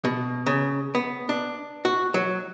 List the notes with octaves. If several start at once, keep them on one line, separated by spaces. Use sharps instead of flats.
B2
C#3
B3
D4
F#4
F#3